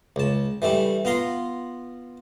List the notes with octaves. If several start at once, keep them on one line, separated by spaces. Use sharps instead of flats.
C#2 A5
E3 G3 A3 E4
B3 F4 A#5 C6